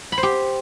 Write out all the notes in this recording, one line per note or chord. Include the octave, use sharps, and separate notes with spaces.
B5
C5
G4